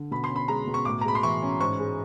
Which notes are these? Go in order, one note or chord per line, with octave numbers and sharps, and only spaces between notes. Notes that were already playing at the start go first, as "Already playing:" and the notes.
Already playing: D3
B2 B5
C6
C#4
B5
G#3 A#5
B2
C#6
A2 D6
A#5
G#3 B5
C6
E3 C#6
C#4
G#2 C#6
G#3